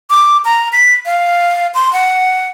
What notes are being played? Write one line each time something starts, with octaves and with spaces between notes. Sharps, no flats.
D6
A#5
B6
F5
C6
F#5